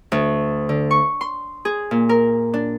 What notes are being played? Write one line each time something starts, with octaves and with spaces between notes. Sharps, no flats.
D2
D3
C#6
C6
G#4
A#2
A#4
D4